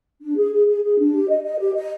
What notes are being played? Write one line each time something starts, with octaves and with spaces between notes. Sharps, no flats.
D4
G#4
G#4
G#4
G#4
D4
G4
D#5
D#5
G4
D#5